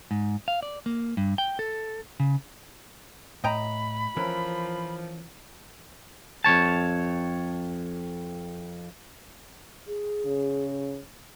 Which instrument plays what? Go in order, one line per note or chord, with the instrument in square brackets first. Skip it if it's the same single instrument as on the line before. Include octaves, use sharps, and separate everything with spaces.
[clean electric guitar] G#2
F5
D5
A#3
G2
G5
A4
C#3
[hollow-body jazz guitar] A2 [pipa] D#5 G5 A#5 [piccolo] B5
[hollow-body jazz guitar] E3 C#4 A#4 [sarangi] F3
[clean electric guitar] F2 G#2 C#5 A5
[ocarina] G#4
[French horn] C#3